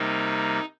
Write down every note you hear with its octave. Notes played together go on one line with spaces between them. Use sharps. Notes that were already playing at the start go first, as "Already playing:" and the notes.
Already playing: C3 G3 A#3 D#4